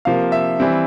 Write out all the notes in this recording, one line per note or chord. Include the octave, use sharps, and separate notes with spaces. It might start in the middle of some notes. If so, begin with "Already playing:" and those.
C3 F3 A#3 F5
E5
E3 G3 C4